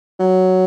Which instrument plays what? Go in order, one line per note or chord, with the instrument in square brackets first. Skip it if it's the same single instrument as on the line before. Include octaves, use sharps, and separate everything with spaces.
[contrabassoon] F#3